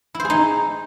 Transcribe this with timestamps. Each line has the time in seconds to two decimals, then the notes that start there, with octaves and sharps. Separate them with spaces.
0.15 E4
0.20 C5
0.25 G#4
0.30 D#4